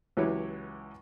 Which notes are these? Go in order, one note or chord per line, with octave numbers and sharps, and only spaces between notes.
C#2 E3 F#3 E4 G4 C#5